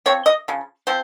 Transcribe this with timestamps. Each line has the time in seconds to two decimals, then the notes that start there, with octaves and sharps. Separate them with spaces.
0.06 F3 C4 C#5
0.26 D#5
0.48 C#3 F3
0.87 F3 C4 C5